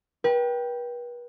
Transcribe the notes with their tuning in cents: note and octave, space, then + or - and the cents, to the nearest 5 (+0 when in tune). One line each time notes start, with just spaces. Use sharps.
B4 -40 G5 +0